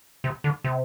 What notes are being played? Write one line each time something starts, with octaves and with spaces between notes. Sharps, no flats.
C3
D3
C3